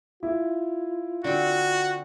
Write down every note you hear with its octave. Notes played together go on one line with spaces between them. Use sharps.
E4 F4
D3 C4 F#4